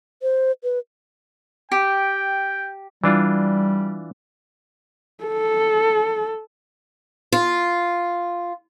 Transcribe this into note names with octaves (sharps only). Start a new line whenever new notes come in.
C5
B4
G4 G5
E3 G3 D4 F4
A4
F4